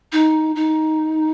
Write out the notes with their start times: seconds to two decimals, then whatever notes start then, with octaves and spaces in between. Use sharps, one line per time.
0.12 D#4
0.56 D#4